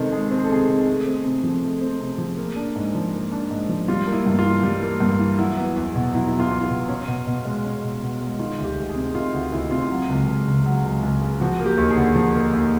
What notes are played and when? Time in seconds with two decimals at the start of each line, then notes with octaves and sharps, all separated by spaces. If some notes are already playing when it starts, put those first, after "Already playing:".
Already playing: C3 D#3 G#3 C4 A4
0.12 G#3 G#4
0.31 C4
0.37 G#4
0.44 A4
0.50 C3 G#4
0.62 G#4
0.69 D#3
0.87 A3
1.06 C4
1.25 C3
1.43 F3
1.63 A3
1.81 C4
2.01 C3
2.18 F3
2.37 A#3
2.56 D4
2.76 G#2
2.95 F3
3.13 A#3
3.32 D4
3.51 G#2
3.69 F3
3.88 G3 F4
4.07 A#3
4.13 E4
4.26 G2
4.39 F4
4.45 E3
4.63 G3
4.82 A#3
5.00 G2
5.19 E3
5.38 F#3 E4
5.57 B3
5.76 E2
5.96 B2
6.13 F#3 E4
6.27 E4
6.32 B3
6.40 F4
6.51 E2
6.63 F4
6.70 B2
6.89 C#4
7.08 B2
7.27 B2
7.45 G#3
7.64 C#4
7.84 B2
8.02 B2
8.21 G#3
8.39 D#3 F4
8.58 D2
8.64 G4
8.78 D2
8.89 G#4
8.96 C3
9.15 D#3 F4
9.33 D2 F#4
9.52 D2 E4
9.71 C3 F4
9.91 F#3
10.09 C#2
10.27 C#2
10.47 C#3
10.66 F#3
10.84 C#2
11.03 C#2
11.22 C#3
11.40 F3 F#4
11.60 A#3
11.66 G4
11.78 D#2
11.90 G#4
11.97 D3
12.16 F3
12.35 A#3
12.53 D#2